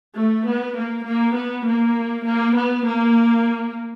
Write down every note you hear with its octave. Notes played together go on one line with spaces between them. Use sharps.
A3
B3
A#3
A#3
B3
A#3
A#3
B3
A#3